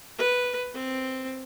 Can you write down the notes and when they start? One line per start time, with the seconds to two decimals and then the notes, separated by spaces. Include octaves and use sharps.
0.18 B4
0.74 C4